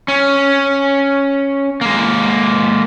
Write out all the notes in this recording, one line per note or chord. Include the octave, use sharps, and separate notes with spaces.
C#4
G#3 A#3